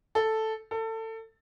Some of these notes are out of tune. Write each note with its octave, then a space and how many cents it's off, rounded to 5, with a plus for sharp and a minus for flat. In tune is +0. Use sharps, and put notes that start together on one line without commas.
A4 +0
A4 +25